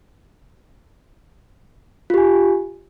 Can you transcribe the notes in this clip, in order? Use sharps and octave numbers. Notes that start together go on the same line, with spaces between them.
F4 G4 G#5